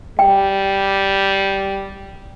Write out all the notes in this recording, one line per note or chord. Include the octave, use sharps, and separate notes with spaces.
G3 G5